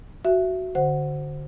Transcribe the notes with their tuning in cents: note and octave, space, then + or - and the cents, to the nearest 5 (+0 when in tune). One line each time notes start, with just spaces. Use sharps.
F#4 +5 E5 +15
D3 +0 C5 +0 F#5 +0